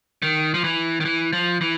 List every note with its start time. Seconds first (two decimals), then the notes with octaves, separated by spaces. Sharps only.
0.22 D#3
0.54 F3
0.64 E3
1.00 D#3
1.05 E3
1.33 F3
1.61 E3